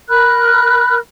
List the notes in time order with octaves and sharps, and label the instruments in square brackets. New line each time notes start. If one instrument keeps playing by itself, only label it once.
[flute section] A#4 B5 F6 F#6